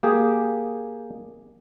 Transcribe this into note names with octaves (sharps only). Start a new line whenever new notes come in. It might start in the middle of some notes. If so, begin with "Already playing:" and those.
A#3 G4 G#4